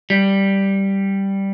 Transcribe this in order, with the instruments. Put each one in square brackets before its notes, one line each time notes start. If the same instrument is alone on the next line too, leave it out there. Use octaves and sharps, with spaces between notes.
[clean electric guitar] G3